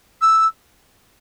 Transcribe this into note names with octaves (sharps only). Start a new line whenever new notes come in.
E6